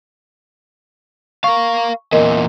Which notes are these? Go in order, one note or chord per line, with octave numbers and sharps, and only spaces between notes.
A#4 F5 C#6
E2 A#2 A#4 D#5